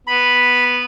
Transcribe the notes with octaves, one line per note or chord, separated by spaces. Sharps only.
B3 B5